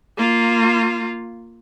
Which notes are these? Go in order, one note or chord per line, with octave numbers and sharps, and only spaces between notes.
A#3 F4